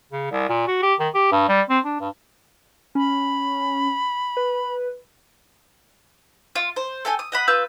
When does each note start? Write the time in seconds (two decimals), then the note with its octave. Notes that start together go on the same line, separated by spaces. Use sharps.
0.12 C#3
0.31 C2
0.49 A#2
0.67 F#4
0.83 G4
1.00 D#3
1.14 G4
1.32 G2
1.49 G3
1.69 C4
1.85 D4
2.00 G2
2.95 C#4 B5
4.37 B4
6.56 F4
6.76 C5
7.05 A4 G5 G#5
7.19 D#6
7.32 D#5 F#5 B5
7.48 F4 B4 E6 G6